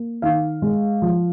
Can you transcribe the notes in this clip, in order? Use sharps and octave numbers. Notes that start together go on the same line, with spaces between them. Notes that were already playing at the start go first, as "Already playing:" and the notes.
Already playing: A#3
D#3 F5
G#3
F3